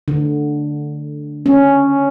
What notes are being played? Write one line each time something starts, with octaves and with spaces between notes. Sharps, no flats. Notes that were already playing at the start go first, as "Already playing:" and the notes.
D3
C#4